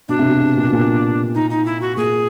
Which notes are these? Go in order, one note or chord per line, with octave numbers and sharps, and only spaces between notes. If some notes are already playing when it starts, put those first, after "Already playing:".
B2 D4
C3
B2
C3
A#2
B2
A#2
D#4
D#4
E4
F#4
A#2 G#4